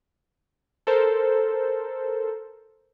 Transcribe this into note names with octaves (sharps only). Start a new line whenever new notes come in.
A4 A#4 C5